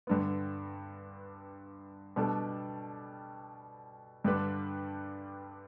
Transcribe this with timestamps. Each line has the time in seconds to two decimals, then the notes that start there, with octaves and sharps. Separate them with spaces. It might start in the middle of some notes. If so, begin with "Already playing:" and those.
0.07 G2 D3 B3
2.16 B2 G3 D4 A4
4.24 G2 D3 G3 D4 B4